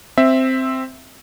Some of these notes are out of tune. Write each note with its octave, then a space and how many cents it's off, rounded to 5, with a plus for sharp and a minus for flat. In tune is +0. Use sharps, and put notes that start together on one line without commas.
C4 +0 E5 +0